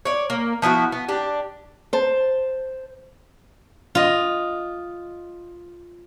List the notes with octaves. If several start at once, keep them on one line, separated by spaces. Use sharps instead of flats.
C#5 D5
A#3
F3 B3 E4 F#4
B3
D4 G4
C5 A5
F4 D#5